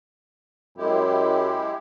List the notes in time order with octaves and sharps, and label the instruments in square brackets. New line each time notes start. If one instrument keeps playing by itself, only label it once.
[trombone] F#2 [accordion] G#3 E4 G4